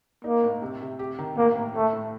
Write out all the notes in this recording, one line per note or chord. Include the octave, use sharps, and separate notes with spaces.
A#3 D#4
A2
C3
C3
G4
D#3
A2 A#3
A2
A2 A3
A2